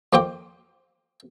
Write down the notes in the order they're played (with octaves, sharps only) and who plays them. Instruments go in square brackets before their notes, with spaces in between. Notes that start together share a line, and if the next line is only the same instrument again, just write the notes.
[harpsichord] F2 A#3 C5 G5 D6